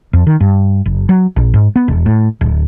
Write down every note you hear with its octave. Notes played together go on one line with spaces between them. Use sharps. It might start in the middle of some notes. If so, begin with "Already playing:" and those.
F2
D#3
G2
F#1
F#3
A#1
G#2
B3
E1
A2
D1